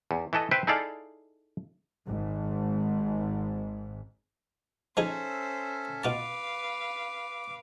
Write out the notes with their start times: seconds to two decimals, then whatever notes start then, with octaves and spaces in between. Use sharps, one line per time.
0.11 E2
0.33 E3 E4 A4 D#5
0.51 B4 C5 E5 G5
0.67 D#4 E4 G#4 A4 D5 F5
2.07 G#1 G#2
4.97 F3 C#4 D#4 G#4 A4 C5 E5
6.04 B2 F4 B4 F5 A5 D6